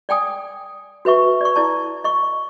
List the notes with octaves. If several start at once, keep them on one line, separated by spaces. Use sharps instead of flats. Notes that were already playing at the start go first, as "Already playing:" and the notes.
D5 G5 G#5 D#6
F#4 B4 E5 C#6
D5 C#6
E4 D5 A5
D#5 C#6